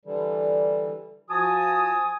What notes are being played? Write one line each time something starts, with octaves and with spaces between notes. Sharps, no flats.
D3 E3 G3
F3 F#4 G#5 A5 D#6